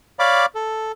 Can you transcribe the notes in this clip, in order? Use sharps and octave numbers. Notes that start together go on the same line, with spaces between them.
C#5 D5 F5 B5 D6
A4